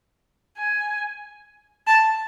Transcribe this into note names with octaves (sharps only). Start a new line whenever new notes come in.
G#5
A5